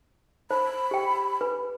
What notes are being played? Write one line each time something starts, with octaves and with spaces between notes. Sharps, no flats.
C5 B5
G4 G5
B4